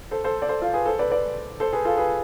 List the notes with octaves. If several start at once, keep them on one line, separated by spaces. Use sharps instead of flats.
A4 C5
A4 C5
D5
A4 C5
F4 A4
G#4 B4
A4 C5
B4 D5
B4 D5
A4 C5
G#4 B4
F4 A4
G#4 B4